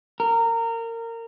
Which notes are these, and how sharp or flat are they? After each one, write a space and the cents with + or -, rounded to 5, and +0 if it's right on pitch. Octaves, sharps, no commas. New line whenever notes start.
A#4 -25